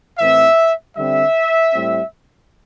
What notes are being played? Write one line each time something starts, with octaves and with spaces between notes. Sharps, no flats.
A2 E3 C4 E5
D3 G3 C4 E5
A2 G3 C4